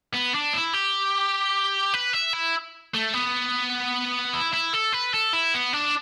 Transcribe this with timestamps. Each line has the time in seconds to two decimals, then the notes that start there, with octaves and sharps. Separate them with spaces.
0.14 B3
0.34 D4
0.53 E4
0.73 G4
1.94 B4
2.13 E5
2.33 E4
2.94 A3
3.13 B3
4.34 E4
4.54 E4
4.74 A4
4.93 B4
5.14 A4
5.33 E4
5.54 B3
5.73 D4